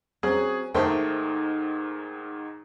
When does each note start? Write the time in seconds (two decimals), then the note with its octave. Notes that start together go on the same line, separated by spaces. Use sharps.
0.23 F#3 C4 C#4 G#4
0.75 G#2 D#3 A3 D#4 A#4 C5 E5 G5